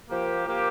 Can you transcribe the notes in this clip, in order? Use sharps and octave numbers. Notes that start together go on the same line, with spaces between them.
F3 A#3 G4
F3 A#3 G4